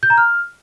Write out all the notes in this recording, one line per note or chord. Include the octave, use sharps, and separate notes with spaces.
G6
A#5
F6